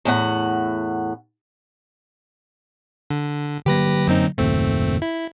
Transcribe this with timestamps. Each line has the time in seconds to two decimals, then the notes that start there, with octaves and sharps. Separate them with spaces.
0.05 E2 A2 F#5
3.11 D3
3.66 D3 F#3 A#3 G4 B4 A#6
4.08 F#2 C4 D#4
4.38 F#1 D#2 A#2 A3 C4
5.02 E4